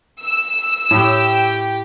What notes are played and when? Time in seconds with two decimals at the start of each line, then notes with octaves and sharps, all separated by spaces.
0.21 E6
0.91 A2 G4 G5